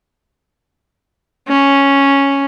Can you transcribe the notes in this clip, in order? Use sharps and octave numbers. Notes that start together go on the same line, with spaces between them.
C#4